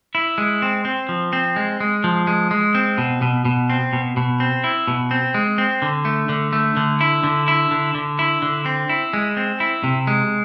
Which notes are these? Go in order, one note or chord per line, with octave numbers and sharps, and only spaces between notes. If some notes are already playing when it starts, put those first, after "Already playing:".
E4
G#3
C4
C4
F3
C4
G#3
G#3
F3
G#3
G#3
C4
B2
B2
B2
C4
B2
B2
C4
E4
B2
C4
G#3
C4
D3
A3
D3
A3
D3
E4
D3
E4
D3
D3
E4
D3
C4
E4
G#3
C4
E4
C3
G#3